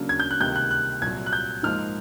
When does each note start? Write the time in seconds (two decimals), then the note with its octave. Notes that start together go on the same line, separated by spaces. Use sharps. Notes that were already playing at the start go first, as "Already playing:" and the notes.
Already playing: C#3 F#3 A#3 D4
0.09 G#6
0.20 G6
0.31 F#6
0.40 C#2 C3 D#3 G3 A#3 G6
0.56 F#6
0.71 F#6
1.02 C2 A#2 F#3 G#6
1.26 F#6
1.33 G6
1.63 G#2 F3 A#3 D#4 F6